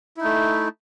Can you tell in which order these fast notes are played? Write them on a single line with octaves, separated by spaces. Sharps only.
E4 D#4 A3